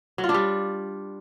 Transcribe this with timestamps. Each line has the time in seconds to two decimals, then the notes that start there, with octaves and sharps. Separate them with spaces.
0.18 F#3
0.24 F4
0.29 D4
0.34 G3